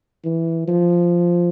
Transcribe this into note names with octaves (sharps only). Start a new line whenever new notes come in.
E3
F3